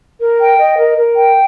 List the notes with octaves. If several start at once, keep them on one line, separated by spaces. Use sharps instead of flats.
A#4
G5
D#5
A#4
A#4
G5